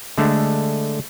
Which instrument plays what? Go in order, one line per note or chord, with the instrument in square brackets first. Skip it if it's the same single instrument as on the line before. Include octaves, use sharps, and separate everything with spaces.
[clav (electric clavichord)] D3 G#3 A3 D4